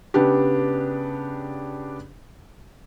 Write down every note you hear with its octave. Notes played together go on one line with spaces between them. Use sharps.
C#3 B3 D4 G4